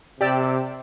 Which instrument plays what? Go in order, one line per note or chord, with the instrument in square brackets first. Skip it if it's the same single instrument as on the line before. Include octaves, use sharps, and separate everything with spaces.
[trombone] C3 [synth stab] G4 D5 E6